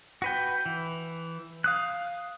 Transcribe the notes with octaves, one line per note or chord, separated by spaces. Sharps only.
F#4 B4 G5
E3
F5 D#6 F#6